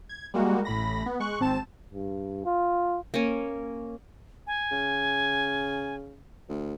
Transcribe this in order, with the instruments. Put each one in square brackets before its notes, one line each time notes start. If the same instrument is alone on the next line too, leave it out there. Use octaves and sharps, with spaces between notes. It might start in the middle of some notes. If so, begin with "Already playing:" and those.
[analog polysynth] G#6
G3 G#3 A#3 F#4
A1 A2 B5 A#6
B3
G#3 C#6 F#6
G#1 C4 A5 E7
[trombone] G2
F4
[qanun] A#3 C#4
[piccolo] G#5
[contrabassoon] C#3
D2